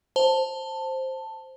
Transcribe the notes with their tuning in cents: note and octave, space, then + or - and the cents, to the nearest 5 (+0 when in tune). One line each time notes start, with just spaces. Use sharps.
C5 +5 A5 +10